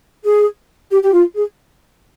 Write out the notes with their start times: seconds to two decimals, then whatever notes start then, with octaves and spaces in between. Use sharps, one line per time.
0.24 G#4
0.91 G4
1.03 G4
1.13 F4
1.36 G#4